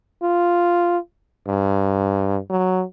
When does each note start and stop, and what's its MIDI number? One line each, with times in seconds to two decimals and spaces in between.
0.23 0.98 65
1.48 2.38 43
2.50 2.84 54